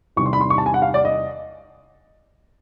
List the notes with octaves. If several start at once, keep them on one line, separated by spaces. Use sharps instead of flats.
E2 C3 D#3 G3 C#6
C6
B5
C6
C#6
A5
G#5
F#5
F5
D5
D#5